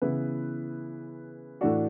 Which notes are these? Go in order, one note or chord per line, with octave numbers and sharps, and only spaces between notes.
C#3 E3 B3 E4 B4
A2 E3 A3 D4 F#4